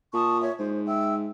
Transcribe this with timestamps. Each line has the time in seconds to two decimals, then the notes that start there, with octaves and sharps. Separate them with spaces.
0.13 A#2 A5 C#6 D#6
0.41 C#5 E5
0.59 G#2 C5
0.87 E5 G5 E6